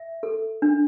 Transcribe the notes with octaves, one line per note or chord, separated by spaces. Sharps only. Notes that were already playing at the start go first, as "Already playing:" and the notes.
Already playing: E5
A4
D4